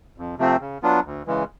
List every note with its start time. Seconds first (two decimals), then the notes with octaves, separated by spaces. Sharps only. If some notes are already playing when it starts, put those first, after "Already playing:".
0.18 F2
0.38 C3 F3 A3 C4
0.61 C#3
0.83 F#3 B3 D4 F4
1.05 D2
1.26 C#3 E3 G#3